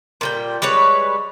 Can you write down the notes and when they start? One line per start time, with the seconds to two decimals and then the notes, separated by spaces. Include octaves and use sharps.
0.21 A#2 G3 G5
0.62 G3 G#3 B4 C#5